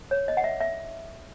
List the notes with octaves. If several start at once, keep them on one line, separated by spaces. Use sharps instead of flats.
C#5
D#5
F#5
E5
E5